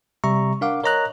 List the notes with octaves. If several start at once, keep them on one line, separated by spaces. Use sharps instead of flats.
C3 G3 E5 A#5 C#6
D4 A#4 F5 F#5 D6
A#4 C#5 D#5 A#5 D#6 F#6